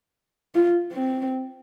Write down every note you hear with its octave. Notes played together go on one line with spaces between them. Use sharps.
F4
C4